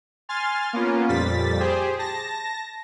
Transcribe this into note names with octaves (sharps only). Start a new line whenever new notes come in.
G#5 C6 F6 A6
A#3 B3 C#4 F4
F2 A#2 G3 A6 B6
G4 G#4 C5
A5 A#6